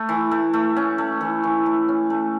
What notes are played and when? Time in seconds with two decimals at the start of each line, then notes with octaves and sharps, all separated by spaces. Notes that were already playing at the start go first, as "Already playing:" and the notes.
Already playing: A3
0.09 E3
0.31 A3
0.53 A3
0.76 C#4
0.98 A3
1.21 E3
1.43 E3
1.66 A3
1.89 C#4
2.10 A3